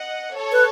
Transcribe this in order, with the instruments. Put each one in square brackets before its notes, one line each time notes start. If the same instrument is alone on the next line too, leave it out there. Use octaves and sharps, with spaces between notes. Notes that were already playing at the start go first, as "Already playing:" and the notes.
Already playing: [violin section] D#5 F#5
A4 C#5
[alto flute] B4